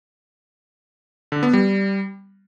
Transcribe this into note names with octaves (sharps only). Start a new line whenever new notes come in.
D3
B3
G3